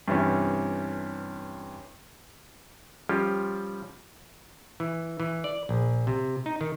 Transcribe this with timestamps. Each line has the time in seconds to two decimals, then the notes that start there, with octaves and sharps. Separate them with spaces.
0.08 G2 C3 E3 C#4
3.09 F3 G3 C#4 F4 G4
4.80 E3
5.20 E3
5.44 D5
5.69 A#1
6.07 C3
6.46 D#4
6.61 D#3